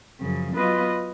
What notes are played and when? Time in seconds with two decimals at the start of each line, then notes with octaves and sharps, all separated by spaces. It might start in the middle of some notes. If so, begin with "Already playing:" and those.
0.20 F#2 C#3 F3
0.54 F#3 B3 F4 B4 D#5